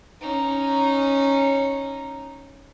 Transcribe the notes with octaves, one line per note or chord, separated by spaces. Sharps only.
C#4 D#4